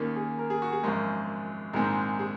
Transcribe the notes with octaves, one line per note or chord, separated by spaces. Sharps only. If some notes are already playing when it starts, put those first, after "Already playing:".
Already playing: D#2 D#3 A#3 C#4
G#4
A#4
G#4
F#4
G#4
G#1 F#2 F3 G#3 A#4
A#1 G#2 D#3 G#3 C4 A#4
G#4